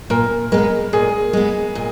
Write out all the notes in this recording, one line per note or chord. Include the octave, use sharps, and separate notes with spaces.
A#2 A#4
G#3 B3 A#4
A#2 G#4
G#3 B3
A#2